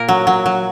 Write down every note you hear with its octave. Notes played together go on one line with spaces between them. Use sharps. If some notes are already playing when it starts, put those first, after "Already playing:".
Already playing: A#2 A#3 A#4
F#3
F#3
F#3